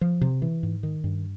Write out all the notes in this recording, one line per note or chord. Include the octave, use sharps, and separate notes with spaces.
F3
C3
E3
G#2
D#3
G2